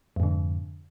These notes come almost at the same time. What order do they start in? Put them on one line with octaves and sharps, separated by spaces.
F2 G#2 D3